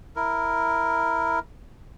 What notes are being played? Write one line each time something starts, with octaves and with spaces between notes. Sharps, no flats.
E4 A#4